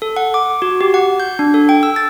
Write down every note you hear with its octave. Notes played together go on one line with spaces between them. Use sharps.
A4
F#5
D6
F#4
G4
F#5
G6
D4
A4
G5
E6
A6